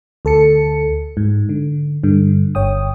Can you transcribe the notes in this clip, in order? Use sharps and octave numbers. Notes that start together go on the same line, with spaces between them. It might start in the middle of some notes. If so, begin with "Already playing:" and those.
D2 A4 A5 C#7
G#2
D3
G2 D3
G1 C#5 G5 D#6